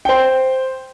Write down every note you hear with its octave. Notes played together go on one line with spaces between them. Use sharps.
C5 G5